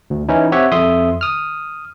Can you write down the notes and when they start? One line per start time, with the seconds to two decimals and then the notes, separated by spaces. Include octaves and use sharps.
0.10 D2
0.29 E3 C#4 D#4 E4
0.52 C4 G4 C#5 E5 F#5
0.72 F2 E5 C6 D#6
1.21 D#6 F6